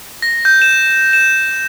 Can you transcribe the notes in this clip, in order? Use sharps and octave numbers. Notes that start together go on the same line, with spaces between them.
A#6
G6
E7
E7
E7